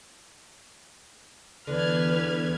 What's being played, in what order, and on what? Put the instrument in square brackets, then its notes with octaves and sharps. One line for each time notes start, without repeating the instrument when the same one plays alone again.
[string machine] E2 G#6 [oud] D3 [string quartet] B4 F6